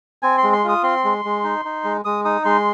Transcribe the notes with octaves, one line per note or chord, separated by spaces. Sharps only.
C4 G#5
C6
G#3
C6
F4 D#6
C4 C6
G#3
G#3
D#4
D#4
G#3
G#3 D#6
D#4 D#6
G#3 C6